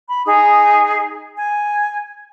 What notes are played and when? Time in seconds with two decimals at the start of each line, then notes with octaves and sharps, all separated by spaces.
0.09 B5
0.27 D#4 G#4 D#6
1.37 G#5